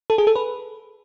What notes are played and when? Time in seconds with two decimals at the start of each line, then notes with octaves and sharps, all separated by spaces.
0.10 A4
0.18 G#4
0.27 A4
0.36 B4